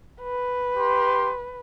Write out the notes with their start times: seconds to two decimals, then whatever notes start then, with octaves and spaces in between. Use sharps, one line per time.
0.22 B4
0.77 G4 C6